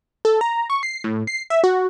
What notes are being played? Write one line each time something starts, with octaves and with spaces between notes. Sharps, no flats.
A4
A#5
C#6
C7
A2
C7
E5
F#4